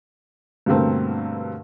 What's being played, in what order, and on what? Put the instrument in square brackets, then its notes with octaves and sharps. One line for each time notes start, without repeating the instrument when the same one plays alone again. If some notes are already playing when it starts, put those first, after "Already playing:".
[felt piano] G2 B2 D3 A3 A#3 C4